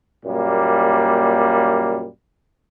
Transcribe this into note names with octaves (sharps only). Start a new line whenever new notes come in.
F#2 A#2 G3 A#3